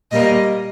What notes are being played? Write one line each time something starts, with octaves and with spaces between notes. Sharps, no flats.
A#2 G3 A#3 D#5